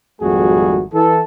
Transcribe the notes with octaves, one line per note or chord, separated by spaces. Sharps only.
G#1 F2 G3 A3 F#4 G#4
E3 A4